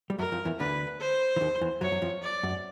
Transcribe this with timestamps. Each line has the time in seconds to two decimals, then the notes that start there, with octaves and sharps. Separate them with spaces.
0.10 G3
0.18 F#2 F#3 A#4
0.32 F2 F3
0.45 E2 E3
0.59 D2 D3 B4
1.00 C5
1.36 E3
1.41 D#2 D#3
1.61 E2 E3
1.81 F#2 F#3 C#5
1.91 F#2 F#3
2.02 F2 F3
2.23 D5
2.43 F#2